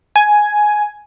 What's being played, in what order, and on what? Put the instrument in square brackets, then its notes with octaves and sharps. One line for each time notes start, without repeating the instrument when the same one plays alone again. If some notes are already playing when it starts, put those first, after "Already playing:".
[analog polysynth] G#5